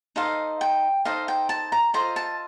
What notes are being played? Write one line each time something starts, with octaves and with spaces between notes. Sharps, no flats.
D#4 A4 C5 D#5 F5
G5
D#4 A4 C5 D#5 F5
G5
A5
A#5
F4 A4 C5 D#5 A#5
A5